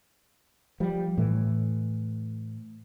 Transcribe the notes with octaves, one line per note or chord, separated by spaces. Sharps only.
F3 G3
A2 E3